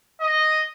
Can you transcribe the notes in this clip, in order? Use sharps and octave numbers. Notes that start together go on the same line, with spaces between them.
D#5